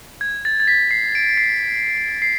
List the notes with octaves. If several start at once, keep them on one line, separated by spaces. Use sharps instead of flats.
G#6
A6
A6
B6
C7
D7
C7
C7